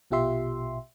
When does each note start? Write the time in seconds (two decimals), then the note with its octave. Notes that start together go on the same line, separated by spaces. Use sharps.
0.11 A#1 B2 F4 G4 E5 C6